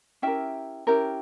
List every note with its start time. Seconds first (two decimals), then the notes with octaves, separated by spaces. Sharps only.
0.22 C#4 E4 G4 A#4 E5 G5
0.87 C#4 E4 G4 A#4